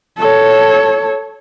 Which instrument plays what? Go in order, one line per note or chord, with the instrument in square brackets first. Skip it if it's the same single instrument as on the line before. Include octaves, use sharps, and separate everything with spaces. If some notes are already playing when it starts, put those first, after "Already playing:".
[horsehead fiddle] A4 C#5